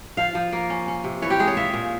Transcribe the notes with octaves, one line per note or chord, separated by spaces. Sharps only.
F3 F5
F3
A#3
C#4
C#4
C3
E3 C#5
G4
G#3 G#4
C#5
F4 E5
A#2